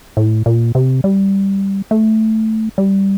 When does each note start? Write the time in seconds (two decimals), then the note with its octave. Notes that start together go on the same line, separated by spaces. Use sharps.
0.17 A2
0.46 A#2
0.75 C3
1.04 G3
1.91 A3
2.78 G3